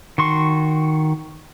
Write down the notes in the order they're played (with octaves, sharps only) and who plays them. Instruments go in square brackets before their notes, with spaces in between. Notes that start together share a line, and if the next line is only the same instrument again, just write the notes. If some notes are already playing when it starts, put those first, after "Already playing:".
[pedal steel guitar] D#3 F#4 C6 C#6